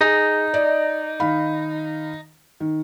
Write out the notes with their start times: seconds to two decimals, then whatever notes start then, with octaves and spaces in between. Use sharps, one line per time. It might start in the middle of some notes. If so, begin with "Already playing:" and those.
0.01 D#4 G#4
0.54 D5 D#5
1.20 D#3 F5 B5
2.60 D#3